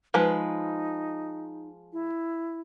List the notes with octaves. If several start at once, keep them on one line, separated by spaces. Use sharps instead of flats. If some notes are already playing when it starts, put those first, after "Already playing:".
F3 G#3 D#4 B4
E4